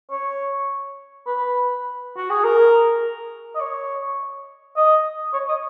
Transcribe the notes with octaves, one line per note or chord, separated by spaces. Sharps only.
C#5
B4
F#4
G#4
A#4
D#5
C#5
D#5
C#5
D#5